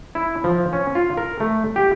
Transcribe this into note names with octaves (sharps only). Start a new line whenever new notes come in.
E4
F3
C#4
F4
A#4
A3
G4